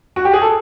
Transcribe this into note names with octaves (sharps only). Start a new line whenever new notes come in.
F#4
G4
G#4
A4